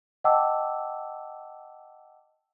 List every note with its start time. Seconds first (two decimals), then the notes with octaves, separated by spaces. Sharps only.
0.24 D#5 F#5 G5 A5 D6 E6